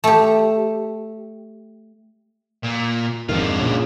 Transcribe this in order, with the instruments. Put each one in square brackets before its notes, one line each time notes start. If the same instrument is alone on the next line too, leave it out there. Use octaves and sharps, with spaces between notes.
[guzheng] A3 G4
[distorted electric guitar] A#2
[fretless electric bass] F2 G#2 D#3 [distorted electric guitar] D3 F4
[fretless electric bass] A#2 C#3